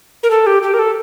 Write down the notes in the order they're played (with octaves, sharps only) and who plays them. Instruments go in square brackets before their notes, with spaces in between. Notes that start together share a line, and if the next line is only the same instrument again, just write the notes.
[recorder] A#4
A4
G4
G4
A#4
A4